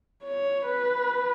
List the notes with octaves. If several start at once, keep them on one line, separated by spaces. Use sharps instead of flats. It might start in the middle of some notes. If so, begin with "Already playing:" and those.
C#5
B4